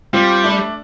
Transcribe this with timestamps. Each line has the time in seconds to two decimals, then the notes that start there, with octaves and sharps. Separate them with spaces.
0.13 G3 C4 F4
0.44 A3 D4